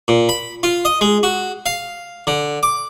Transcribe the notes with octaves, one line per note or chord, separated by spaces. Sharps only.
A#2
B5
F4
D#5
G#3
F#4
F5
D3
D6